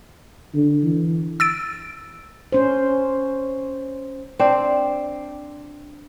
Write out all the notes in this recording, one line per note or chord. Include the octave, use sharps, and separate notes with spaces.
D3
E3
E6 A6 D7
C#4 C5
C4 D4 C5